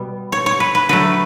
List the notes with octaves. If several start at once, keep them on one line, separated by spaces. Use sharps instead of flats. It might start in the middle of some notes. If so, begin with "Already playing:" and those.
Already playing: B2 G3 B3
C#5
C#5
B4
B4
D3 F#3 A3 B4